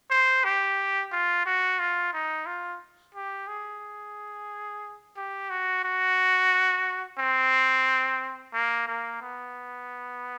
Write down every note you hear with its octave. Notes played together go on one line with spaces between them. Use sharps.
C5
G4
F4
F#4
F4
D#4
F4
G4
G#4
G4
F#4
F#4
C4
A#3
A#3
B3